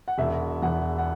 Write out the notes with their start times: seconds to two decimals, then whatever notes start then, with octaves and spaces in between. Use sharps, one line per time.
0.08 F#5
0.18 E1 E5
0.62 E2 F#5
0.98 F#5